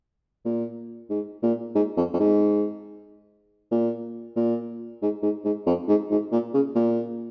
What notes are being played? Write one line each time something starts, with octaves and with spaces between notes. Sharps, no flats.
A#2
G#2
A#2
G#2
F2
F2
G#2
A#2
A#2
G#2
G#2
G#2
F2
G#2
G#2
A#2
C#3
A#2